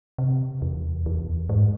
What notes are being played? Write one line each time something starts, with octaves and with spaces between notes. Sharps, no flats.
C3
E2
E2
G#2